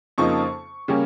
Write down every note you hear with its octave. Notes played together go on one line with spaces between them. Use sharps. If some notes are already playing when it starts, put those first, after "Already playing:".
F2 C#3 F3 A#3 D#4 C#6
C#3 G3 A#3 C#4